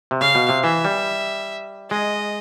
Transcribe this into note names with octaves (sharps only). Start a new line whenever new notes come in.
C3
C#3 F5
B2
C3
E3 E5
G3
G#3 D#5